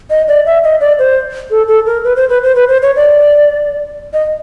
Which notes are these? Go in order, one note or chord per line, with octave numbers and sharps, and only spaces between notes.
D#5
D5
E5
D#5
D5
C5
A4
A4
A#4
B4
C5
B4
C5
B4
C5
C#5
D5
D#5